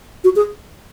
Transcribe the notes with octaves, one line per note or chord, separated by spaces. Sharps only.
F#4
G#4